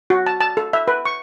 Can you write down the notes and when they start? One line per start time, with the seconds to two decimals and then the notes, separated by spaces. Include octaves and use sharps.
0.10 F#4
0.26 A5
0.41 A5
0.57 A4
0.73 E5
0.88 B4
1.05 C#6